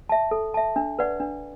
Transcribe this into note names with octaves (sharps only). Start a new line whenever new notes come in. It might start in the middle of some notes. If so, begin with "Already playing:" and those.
E5 A5
A4
E5 A5
D4
B4 D5 F#5
D4